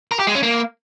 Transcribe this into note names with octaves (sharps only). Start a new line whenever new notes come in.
A#4
G4
G#3
C#4
A#3